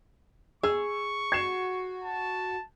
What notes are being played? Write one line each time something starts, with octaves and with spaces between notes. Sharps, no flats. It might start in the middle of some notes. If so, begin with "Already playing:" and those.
G#4 C#6 E6
F#4 G#6 C7 E7
A5